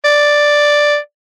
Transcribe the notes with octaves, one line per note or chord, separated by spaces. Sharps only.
D5